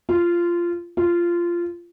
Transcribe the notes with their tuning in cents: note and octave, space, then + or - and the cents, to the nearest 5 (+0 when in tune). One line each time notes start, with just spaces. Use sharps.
F4 -15
F4 -15